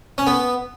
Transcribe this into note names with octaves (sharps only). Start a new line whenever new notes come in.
C#4
B3